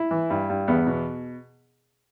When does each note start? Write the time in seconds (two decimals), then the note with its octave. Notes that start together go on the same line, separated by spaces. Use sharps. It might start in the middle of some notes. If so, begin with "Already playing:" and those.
Already playing: E4
0.11 E3
0.30 G2
0.50 G2
0.68 E2 B3
0.87 B2